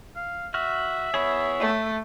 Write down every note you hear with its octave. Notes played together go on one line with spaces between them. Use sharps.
F5
F#4 E5 F6
B3 E4 G#4 C#5
A3